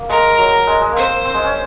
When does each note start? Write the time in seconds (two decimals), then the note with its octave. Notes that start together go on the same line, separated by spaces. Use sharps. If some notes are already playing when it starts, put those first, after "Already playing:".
Already playing: A#3
0.09 G#3 A#4
0.38 F#3
0.67 G#3
0.81 G#3
0.91 A#3 C4 C5
1.25 C4
1.34 G#3
1.44 C#4